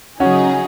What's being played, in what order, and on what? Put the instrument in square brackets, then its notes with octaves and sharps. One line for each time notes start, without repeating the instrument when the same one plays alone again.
[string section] C#3 F#3 D#4 G#4 [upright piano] C#4 F#4